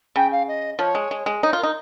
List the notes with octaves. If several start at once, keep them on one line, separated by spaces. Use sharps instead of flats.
C#3 G5
F5
D#5
F3 C#5
G#3
G#3
G#3
D#4 C#5
F4
A#4
D#4